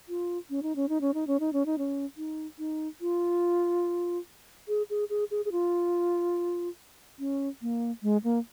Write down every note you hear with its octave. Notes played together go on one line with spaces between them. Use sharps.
F4
C#4
D#4
C#4
D#4
C#4
D#4
C#4
D#4
C#4
D#4
C#4
D#4
D#4
F4
G#4
G#4
G#4
G#4
G#4
F4
C#4
A#3
G#3
A#3